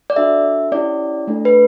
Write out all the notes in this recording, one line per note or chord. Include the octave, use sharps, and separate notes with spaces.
D5
D4 F#4 A4 E5
C#4 E4 G4 D5
A3 D4 A4
B4